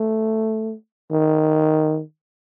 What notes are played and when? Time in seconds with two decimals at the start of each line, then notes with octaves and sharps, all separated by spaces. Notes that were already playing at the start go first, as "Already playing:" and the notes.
Already playing: A3
1.11 D#3